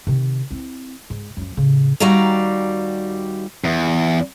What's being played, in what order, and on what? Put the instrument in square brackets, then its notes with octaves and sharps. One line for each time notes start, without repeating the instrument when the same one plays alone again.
[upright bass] C3 D#3
C4 E4
G#2
F#2 F3
A2 C#3
[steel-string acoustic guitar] D#2 G3 F#4 D5 F5 A#5
[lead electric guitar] E2